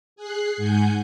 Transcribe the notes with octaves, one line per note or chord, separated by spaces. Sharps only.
G#4 F#6 C7
G#2 F#5 G#5 G6